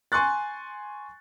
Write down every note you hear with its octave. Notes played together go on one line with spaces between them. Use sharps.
G#5 C6 C#6 F#6 A6